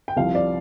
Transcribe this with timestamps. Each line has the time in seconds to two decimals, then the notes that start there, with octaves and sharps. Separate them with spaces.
0.08 G5
0.16 C2 C3 F3 F5
0.35 D5